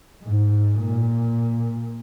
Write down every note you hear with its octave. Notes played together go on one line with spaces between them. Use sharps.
G#2
A#2